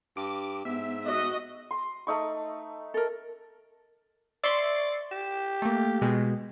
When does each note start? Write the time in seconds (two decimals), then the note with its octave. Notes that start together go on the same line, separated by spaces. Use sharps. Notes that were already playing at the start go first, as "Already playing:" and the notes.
0.17 G2 D6
0.65 G#2 B3 E5
1.06 F#4 D#5
1.71 C6
2.07 A3 D#4 C#6
2.94 A4 A#4
4.44 D5 E5 C6 C#6
5.11 G4 E7
5.62 A3 A#3
6.02 B2 G#3